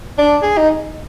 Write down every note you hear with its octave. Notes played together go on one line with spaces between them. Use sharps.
D4
G#4
D#4